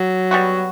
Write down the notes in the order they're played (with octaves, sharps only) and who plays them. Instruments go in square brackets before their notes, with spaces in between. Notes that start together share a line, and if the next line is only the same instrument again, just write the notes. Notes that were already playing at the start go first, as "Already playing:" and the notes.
Already playing: [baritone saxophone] F#3
[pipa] G3 B3 F#4